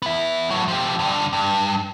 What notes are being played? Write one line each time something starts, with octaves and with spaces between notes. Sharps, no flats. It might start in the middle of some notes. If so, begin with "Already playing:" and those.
B3 E5
A2 F#3
F3 G4
G2 D3
G2